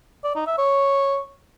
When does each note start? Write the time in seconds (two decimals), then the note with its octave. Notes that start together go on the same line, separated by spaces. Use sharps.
0.24 D5
0.36 D#4
0.47 E5
0.58 C#5